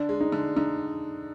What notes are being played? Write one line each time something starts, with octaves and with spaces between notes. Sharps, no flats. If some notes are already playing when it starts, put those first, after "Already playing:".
Already playing: D3 D4
G#3
D#4
D3
D3 D#4